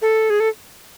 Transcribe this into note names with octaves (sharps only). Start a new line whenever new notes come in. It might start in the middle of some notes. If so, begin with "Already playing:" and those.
A4
G#4
A4